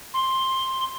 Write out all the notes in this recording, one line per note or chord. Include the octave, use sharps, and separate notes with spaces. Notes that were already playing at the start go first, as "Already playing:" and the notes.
C6